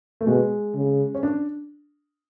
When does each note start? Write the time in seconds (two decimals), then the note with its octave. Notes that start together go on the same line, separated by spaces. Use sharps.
0.21 A3
0.27 B2 G#3
0.75 C#3
1.15 C#4
1.23 D4